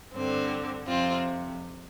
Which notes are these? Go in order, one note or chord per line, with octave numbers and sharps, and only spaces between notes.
G2 D3 C4
F2 C3 C4 F4